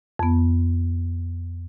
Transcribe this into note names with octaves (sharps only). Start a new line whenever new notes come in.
F2 B3